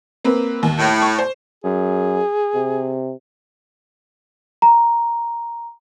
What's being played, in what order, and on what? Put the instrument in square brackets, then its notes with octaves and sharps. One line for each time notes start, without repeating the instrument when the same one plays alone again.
[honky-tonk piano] A#3 C4 B4
D#2
[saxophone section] A2
[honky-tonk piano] C#6
C5
[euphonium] F#2 [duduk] G#4
[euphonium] C3
[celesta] A#5